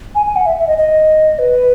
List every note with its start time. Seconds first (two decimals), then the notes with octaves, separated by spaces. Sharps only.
0.15 G#5
0.26 G#5
0.36 F#5
0.46 E5
0.57 E5
0.67 D#5
0.78 D#5
1.39 B4